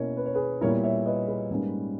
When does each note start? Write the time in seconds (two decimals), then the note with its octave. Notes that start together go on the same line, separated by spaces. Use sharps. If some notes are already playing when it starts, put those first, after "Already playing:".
Already playing: B2 A#3 C#4 E4 A#4 C#5
0.17 B4
0.26 C#5
0.34 G#4 B4
0.61 A#2 G3 B3 E4 A#4 C#5
0.84 C#5 E5
1.06 B4 D#5
1.28 G#4 B4
1.50 G#2 G3 A#3 C#4